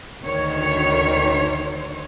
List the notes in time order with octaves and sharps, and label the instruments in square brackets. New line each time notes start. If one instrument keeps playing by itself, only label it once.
[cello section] D2 D#3 C#5